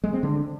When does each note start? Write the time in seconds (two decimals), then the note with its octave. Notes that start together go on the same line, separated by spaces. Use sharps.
0.04 G#3
0.13 C4
0.23 D3